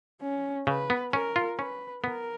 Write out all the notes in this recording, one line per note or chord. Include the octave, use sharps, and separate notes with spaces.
C#4
C#3 B4
B3
C#4 A#4
F4
C#4 B4
B3 A#4